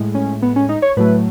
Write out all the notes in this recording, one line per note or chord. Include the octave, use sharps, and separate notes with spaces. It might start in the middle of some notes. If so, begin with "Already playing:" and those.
Already playing: A2 G#3
C#4
B3
C#4
D#4
C#5
A2 F#3 A3 B4